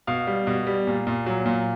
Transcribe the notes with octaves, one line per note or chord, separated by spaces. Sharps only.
B2 F5
G3
B2
G3
A#2
A#2
F#3
A#2